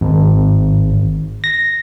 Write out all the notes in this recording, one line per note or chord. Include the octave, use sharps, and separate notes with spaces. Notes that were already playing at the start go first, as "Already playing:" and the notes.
G#1
A#6